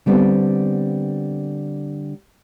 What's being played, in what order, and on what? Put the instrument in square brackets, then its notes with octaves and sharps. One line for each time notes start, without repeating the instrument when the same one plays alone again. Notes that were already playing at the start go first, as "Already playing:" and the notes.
[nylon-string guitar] D3 G3 B3 C4